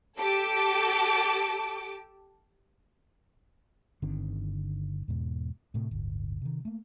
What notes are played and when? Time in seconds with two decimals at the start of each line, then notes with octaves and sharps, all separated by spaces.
0.19 G4 A4 A5 D6 D7
4.02 G1 D3 D#3 C4
5.08 E2 G#2 B2
5.74 A2 C3 A3
5.91 D1 G1
6.42 C3 D#3
6.65 A3 A#3